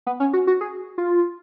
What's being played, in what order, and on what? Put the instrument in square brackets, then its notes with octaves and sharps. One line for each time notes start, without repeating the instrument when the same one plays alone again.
[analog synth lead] B3
C#4
F#4
F#4
G#4
F4